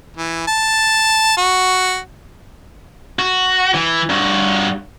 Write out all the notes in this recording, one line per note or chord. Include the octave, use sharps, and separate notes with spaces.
E3
A5
F#4
F#4
E3
G2 F#4